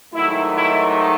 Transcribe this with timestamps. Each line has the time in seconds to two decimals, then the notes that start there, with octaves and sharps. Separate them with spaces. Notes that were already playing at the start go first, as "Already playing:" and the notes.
0.14 G#2 D#3 F#3 A3 E4
0.56 E4